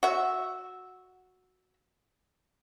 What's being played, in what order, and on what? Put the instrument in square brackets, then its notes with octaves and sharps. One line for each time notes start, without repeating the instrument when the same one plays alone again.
[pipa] F#4 E5